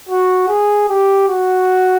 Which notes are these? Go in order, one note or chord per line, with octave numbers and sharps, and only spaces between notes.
F#4
G#4
G4
F#4